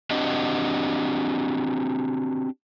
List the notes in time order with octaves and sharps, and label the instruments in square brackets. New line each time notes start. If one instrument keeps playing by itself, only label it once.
[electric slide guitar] C4 D4 F#4 G4 D#5